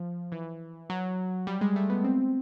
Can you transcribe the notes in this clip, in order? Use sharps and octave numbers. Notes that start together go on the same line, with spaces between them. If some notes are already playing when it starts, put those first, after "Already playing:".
Already playing: F3
E3
F#3
G3
G#3
A3
B3
C4